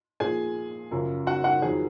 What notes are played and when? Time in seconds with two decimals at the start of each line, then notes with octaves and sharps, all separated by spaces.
0.20 A#2 F3 G#4 G#5
0.91 F#2 C#3 F3
1.27 F#4 F#5
1.44 F#4 F#5
1.62 F2 D#3 F#3 G#4